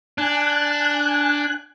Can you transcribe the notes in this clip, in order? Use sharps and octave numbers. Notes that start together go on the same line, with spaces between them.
D4 G#5 F#6